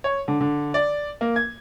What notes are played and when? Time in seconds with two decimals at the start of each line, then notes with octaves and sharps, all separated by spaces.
0.04 C#5
0.28 D3
0.41 D3
0.74 D5
1.21 A#3
1.36 G#6